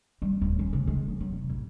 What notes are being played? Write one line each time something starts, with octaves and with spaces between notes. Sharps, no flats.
G3
D1
C#4
C#3
G#3
F#3
F#3
F1
A1